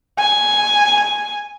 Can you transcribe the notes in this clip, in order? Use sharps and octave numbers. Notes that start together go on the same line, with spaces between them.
G#5